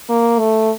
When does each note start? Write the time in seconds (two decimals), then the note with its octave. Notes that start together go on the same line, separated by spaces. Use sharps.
0.09 A#3
0.39 A3